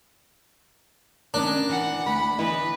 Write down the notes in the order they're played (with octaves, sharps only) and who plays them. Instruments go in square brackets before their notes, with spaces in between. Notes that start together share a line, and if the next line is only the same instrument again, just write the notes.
[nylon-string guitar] D#3 B3 C#4 [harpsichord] D4 [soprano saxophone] A#4
[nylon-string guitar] E3 [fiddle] F#5
[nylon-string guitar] D2 B4 [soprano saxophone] B5
[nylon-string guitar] E3 B3 E4 [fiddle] B4 [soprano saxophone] D#5